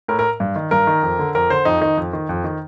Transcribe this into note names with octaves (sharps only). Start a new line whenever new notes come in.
A2 A#4
A#4
G2
D#3
G2 A#4
D#3
F2
D3
F2 A#4
D3 C5
F2 D#4
D#3 D#4
F2
D#3
F2
D#3